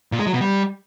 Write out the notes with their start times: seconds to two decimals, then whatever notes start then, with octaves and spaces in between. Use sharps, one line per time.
0.12 A#2
0.19 G#3
0.27 F#3
0.34 B2
0.41 G3